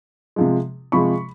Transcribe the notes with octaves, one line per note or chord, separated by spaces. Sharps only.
C3 F3 G#3
C3 F3 G#3 B5 C#6